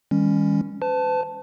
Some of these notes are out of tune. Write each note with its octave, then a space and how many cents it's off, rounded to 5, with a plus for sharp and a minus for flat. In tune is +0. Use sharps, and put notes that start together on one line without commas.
D#3 +30 G3 +45 C#4 +0
B4 +45 A5 +0